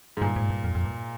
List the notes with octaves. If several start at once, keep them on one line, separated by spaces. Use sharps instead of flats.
G#2
G2 A#2
G#2
G2
F2
F2
G2